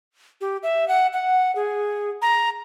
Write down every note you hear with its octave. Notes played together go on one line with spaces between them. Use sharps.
G4
E5
F#5
F#5
G#4
A#5